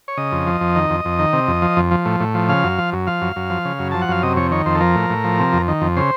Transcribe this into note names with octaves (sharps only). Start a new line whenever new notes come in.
C#5
C#3 D#5
F2
F3
F2
D#3
F2
F2
D#3
C3
F2
F3
F2
F3
A2
A2
F3
C#3 F5
F#2
F3
F#2
F3 F5
F#2
F#2
F3
C#3
F#2
F3 A5
F#5
F#2 F5
C3 D#5
F2 C#5
D#3 C#5
F2 C5
A4
F3 A#4
A2
A2
F3
C3
F2
D#3
F2
C#3 C5